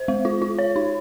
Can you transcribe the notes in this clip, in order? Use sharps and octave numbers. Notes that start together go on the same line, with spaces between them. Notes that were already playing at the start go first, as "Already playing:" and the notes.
Already playing: C5
G#3
F4
F4
C#5
D#4